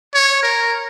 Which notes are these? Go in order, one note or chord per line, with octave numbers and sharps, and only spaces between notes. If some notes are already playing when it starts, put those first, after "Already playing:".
C#5
A#4